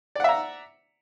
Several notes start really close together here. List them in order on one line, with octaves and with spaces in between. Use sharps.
D5 F#5 E5 A#5